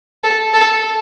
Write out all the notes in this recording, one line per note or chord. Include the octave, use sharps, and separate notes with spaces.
A4
A4